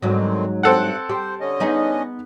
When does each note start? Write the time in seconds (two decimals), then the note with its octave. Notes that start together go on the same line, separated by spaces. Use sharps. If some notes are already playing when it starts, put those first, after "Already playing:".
0.02 G#2 D3 D#3 F#3 C4
0.63 G2 C4 A4 F#5 F#6
1.09 G4 C5
1.41 D3 C#4 D#5
1.60 B3 D#4 G#4